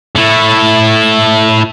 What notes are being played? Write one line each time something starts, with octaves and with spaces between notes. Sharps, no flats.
A3 E4